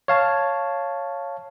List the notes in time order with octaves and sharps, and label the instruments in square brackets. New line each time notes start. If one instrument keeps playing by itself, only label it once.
[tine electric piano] C#5 F5 A5